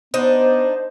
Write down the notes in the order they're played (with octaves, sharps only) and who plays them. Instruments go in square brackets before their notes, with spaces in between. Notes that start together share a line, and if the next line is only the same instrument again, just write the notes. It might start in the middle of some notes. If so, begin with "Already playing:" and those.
[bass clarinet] B3 [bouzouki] D4 D#4 [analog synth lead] C5